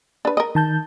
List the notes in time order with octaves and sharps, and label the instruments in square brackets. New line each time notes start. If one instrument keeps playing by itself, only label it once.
[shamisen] D4 B4
A#4 D#5
[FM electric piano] D#3 A5 G6